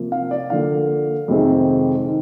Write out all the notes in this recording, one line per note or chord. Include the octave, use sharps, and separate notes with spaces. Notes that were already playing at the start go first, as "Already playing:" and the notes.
Already playing: C3 F3 A#3
F5
D5
D3 F3 A#3 F5
F2 C3 D#3 G#3 C4
D#3